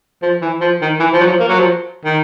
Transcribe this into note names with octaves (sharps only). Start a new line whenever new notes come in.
F3
E3
F3
D#3
E3
F3
F#3
F3
A#3
F#3
F3
D#3